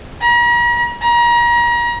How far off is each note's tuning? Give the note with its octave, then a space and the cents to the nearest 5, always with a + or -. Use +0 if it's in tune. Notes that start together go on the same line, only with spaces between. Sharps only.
A#5 +45
A#5 +35